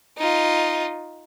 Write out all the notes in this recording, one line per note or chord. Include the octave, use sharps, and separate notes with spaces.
D#4 F4